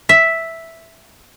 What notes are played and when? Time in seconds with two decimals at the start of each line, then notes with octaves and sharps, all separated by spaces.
0.09 E5